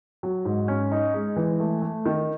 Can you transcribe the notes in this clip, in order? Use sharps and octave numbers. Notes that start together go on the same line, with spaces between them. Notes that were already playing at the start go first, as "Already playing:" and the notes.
F#3
G#2
C#4
D#4
G#3
E3
A3
A3
D#3